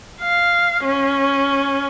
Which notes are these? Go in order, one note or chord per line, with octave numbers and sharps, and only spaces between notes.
F5
C#4